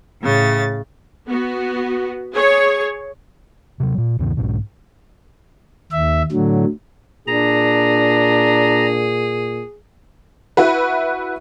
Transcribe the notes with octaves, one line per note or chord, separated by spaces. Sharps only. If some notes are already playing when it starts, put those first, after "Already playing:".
A2 C#3 A6
B3 F#4
G#4 C#5
C3 F#3
A#2
D2 G2 C3 D#3
B1 G#2 B2
D#2 E5
A2 D3 F#3
A#2 D4 G#4 A#5
E4 F#4 B4